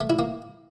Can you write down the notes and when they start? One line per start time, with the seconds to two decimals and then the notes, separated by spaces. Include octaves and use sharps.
0.01 A3
0.10 E4
0.19 A#3